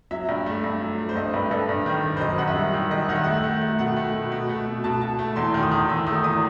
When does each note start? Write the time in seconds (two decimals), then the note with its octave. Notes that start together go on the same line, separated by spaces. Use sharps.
0.11 F#3 E5
0.29 G2
0.46 A3
0.64 G2
0.81 F#3
0.98 A3
1.09 C5
1.16 G2 D#5
1.34 G2 B4
1.51 G2 A4
1.69 G2
1.86 D#3
2.04 D#3
2.17 C5
2.21 F#2 D#5
2.38 F#2 F#5
2.48 E5
2.56 G3
2.74 D#3
2.91 D#3 D#5
3.09 D#3 F#5
3.16 E5
3.24 A3 F#5
3.44 A3
3.61 A3
3.79 B2 F#5
3.96 A3
4.14 B2
4.32 B2
4.49 A3
4.66 B2
4.84 B2 A5
5.01 B2 A5
5.19 A3
5.36 E2 C6
5.54 D#3
5.63 D#6
5.71 D#3
5.89 E2 E6
6.06 A3 D#6
6.24 E2 D#6